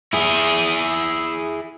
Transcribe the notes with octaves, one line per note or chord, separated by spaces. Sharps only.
E4 G#4